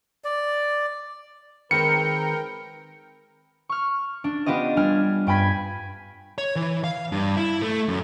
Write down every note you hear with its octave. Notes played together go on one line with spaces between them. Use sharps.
D5
D#3 G#3 C4 A#4 B4 G5 C#7
C#6 F6
D4
B3 D4 F4 G4 D#5
G3 D4 G#5 F6
G2 G5 G#5 B5 G#6 B6
C#5
E3
F5
G2
E4
A3
F#2